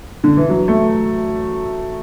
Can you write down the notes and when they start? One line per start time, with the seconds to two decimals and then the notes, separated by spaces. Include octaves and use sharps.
0.24 D3
0.37 E3
0.50 F#3
0.68 A3